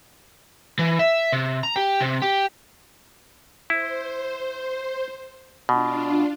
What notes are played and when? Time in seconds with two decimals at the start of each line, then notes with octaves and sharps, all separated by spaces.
0.79 E3
0.99 E5
1.32 C3
1.63 A#5
1.76 G4
2.01 C3
2.22 G4
3.70 E4 C5
5.69 B2 D4 F4